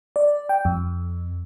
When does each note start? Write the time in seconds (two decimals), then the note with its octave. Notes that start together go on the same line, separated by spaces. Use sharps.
0.16 D5
0.49 G5
0.65 F2